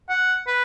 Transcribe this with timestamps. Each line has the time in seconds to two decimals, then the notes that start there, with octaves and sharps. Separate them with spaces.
0.09 F#5
0.47 B4